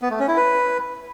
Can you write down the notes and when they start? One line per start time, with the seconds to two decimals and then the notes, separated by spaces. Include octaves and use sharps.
0.02 B3
0.10 A3
0.19 C#4
0.28 E4
0.37 B4